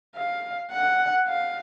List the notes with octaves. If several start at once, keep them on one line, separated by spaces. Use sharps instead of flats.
F5
F#5
F5